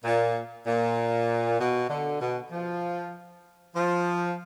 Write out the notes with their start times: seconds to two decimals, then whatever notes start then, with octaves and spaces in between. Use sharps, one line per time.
0.04 A#2
0.66 A#2
1.59 B2
1.89 D3
2.20 B2
2.51 F3
3.75 F3